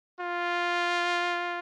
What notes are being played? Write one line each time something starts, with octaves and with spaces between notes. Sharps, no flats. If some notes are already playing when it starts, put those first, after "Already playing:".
F4